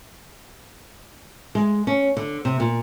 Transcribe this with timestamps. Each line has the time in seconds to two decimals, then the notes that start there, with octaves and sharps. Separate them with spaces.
1.55 G#3
1.87 C#4
2.17 D3
2.45 C3
2.60 A#2